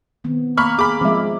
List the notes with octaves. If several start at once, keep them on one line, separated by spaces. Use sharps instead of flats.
D#3 B3 C4
A#3 B5 C#6 F6
G#4 B5 D6
F3 G#3 C4 E5